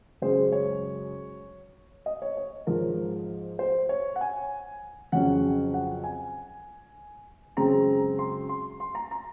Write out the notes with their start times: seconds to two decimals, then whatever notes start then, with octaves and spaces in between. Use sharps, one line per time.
0.22 F#2 C#3 G#3 C#4 C5
0.52 C#5
2.06 D#5
2.22 C#5
2.37 C#5
2.67 G#2 F3 G#3 A#4
3.59 C5
3.89 C#5
4.16 F#5
4.21 G#5
5.12 F2 C#3 F#3 C#4 F#5
5.74 F#5
6.04 G#5
7.57 F#2 C#3 G#3 C4 A#5
8.19 C6
8.49 C6
8.80 C6
8.95 A#5
9.11 A#5